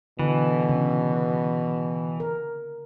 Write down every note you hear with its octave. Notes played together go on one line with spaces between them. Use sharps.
B2 D3 E3
C#3
A#4